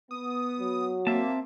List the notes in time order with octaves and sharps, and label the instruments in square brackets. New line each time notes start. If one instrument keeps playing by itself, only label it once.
[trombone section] B3 [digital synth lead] D#6
[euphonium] F#3
[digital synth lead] A#3 [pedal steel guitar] C4 E5 A5